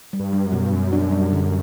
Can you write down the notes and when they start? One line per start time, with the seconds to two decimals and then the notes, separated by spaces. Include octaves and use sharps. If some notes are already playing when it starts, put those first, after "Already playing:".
0.13 G3
0.20 G2
0.33 G3
0.46 F#2
0.52 B2
0.66 G2
0.73 F#2 G3
0.93 D4
1.12 G3
1.33 D3